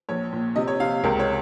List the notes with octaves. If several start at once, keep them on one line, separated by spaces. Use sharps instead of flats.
A#1 C#5
A#2
C3 D#5
C#5
C3 F5
C#2 A#4
C#5